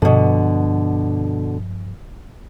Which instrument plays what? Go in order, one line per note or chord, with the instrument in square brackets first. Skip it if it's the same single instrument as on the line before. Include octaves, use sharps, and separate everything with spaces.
[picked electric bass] G2 F3 [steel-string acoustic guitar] B2 D3